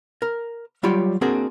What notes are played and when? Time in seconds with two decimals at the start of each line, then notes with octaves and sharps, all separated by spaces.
0.22 A#4
0.83 F#3 G3 F4 G4 C#5 D5
1.21 A#3 C4 D4 F#4 G#4 A#4